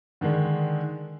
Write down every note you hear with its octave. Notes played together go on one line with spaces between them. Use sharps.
D3 D#3 G#3 D4